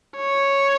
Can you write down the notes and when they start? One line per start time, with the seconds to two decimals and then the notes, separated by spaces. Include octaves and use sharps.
0.17 C#5